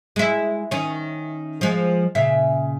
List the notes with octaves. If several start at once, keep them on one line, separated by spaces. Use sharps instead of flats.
G#3 E4
D#3 C#4
F3 G#3
A#2 C#3 E5